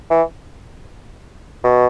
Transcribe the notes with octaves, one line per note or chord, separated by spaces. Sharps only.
E3
B2